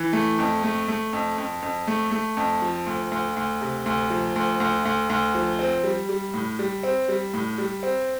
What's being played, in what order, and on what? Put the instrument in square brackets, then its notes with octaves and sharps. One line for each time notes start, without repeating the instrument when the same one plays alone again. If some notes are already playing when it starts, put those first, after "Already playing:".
Already playing: [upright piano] E3
A3
F2
A3
A3
F2
F2
F2
A3
A3
F2
F3
D2
D2
D2
C3
D2
F3
D2
D2
D2
D2
F3
C4
G3
G3
A2
G3
C4
G3
A2
G3
C4